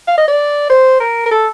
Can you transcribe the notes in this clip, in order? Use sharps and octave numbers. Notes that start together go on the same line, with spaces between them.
F5
D#5
D5
C5
A#4
A#4
A4